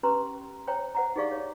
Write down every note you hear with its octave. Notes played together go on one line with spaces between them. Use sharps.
C#4 G4 B4 A#5 C6
C5 C#5 G5 A#5
C5 F#5 A#5
D#4 G4 G#4 D5 F5 C#6
C#5